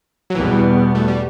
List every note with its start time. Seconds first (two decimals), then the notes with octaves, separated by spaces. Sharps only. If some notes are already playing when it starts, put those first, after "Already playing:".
0.30 F#3
0.35 E2 B2 E3 G3 B3
0.95 A3
1.08 G3